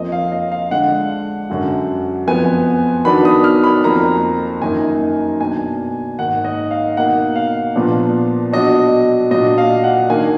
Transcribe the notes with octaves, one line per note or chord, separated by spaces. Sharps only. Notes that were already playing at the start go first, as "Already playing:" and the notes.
Already playing: F2 F3 A#3 D#5
F5
D#5
F5
D3 G#3 D4 F#5
F#2 D3 F#3
F2 F3 B3 G#5
D#3 F#3 B3 D4 B5
D#6
F6
B5
F2 F3 A#3 A#5
F#2 D#3 A#3 D#4 G#5
B2 A#3 D4 G#5
G#2 D#3 A#3 D#4 F#5
D#5
F5
B2 A#3 D#4 F#5
F5
A#2 F3 B3 D4
B2 F#3 D4 D#5
A#2 F#3 D4 D#5
F5
F#5
D#3 A#3 D4 G#5